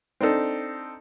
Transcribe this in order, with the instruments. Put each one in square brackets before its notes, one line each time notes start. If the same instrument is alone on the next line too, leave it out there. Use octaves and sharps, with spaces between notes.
[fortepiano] C4 D4 D#4 A4